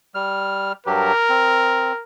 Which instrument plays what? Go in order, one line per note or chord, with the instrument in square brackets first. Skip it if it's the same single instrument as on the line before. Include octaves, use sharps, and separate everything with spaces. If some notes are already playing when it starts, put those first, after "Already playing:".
[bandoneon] G3 F6
[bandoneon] G2 F#3 G4 [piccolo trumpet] A#4
[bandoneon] C4